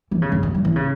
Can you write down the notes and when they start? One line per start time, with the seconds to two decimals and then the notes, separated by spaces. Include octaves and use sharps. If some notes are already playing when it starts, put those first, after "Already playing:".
0.11 E3
0.22 C#3
0.32 F#2
0.43 F#2
0.54 F#3
0.65 E3
0.76 C#3